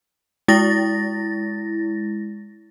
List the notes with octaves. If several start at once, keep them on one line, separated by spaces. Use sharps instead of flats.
G#3 E4 A6 A#6